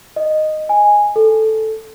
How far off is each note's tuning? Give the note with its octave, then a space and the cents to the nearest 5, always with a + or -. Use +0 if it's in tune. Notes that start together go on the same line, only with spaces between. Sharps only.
D#5 -10
G#5 -5
A4 +0